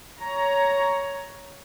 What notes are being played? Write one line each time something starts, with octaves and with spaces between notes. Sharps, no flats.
C#5 A#5